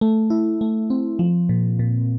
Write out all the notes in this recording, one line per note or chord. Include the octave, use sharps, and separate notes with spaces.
A3
E4
A3
C4
F3
A#2
A#2